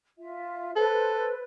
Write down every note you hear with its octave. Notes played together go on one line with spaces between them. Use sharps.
F4 E5
A4 B4 C5